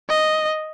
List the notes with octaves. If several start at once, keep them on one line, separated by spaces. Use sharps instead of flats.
D#5